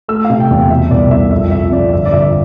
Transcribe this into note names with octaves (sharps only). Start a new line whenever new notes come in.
A3 E6
F5
C3
G5
E2
B2 E5
C2 D5
C2 E5
F2 E5
F2 E5
F2 D5
G1 E5
D5
G1 E5